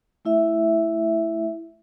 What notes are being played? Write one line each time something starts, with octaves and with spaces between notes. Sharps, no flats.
A3 E4 E5